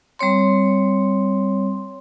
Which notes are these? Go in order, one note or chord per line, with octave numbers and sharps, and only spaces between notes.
G3 C4 C#5 C6